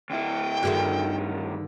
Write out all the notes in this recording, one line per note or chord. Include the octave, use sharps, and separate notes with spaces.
D2 E4 G5
G2 D3 D#3 F#4 G#4